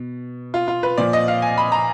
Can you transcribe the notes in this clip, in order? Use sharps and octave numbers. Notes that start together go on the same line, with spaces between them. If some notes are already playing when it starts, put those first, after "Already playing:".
Already playing: B2
F4
F4
B4
A#2 F3 D5
D#5
F5
G#5
B5
A#5